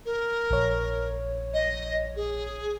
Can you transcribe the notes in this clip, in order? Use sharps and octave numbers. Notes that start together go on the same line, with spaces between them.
A#4
A#1 C#5
D#5
G#4